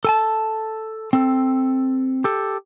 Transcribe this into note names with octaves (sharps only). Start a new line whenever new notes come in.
A4 G#5 A5
C4 A4
G4 A4